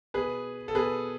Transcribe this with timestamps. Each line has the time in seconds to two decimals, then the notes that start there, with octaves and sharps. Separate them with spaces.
0.14 B2 G#4 B4
0.68 A4
0.75 B2 G#4 B4